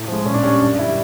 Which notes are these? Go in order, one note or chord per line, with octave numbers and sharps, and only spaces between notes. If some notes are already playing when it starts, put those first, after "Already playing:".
Already playing: A2
F3 G#3
A#2 C#4
D4
G3 C#4
F#2 D4
D3 G3 E4